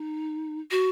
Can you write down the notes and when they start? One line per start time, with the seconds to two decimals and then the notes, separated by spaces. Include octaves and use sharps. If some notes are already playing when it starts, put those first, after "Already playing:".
Already playing: D#4
0.71 F#4